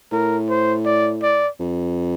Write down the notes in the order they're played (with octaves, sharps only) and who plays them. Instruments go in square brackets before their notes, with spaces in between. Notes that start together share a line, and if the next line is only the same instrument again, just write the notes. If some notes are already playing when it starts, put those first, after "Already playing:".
[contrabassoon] A2 [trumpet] A#4
[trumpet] C5
D5
D5
[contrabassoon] F2